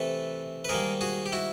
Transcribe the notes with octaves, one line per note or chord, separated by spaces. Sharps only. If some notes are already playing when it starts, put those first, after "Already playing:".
Already playing: C3 E3 A3 A4 B4
B4
G#2 D#3 G3 A#3 G#4 A#4
F#4 G#4
G4
E4 F#4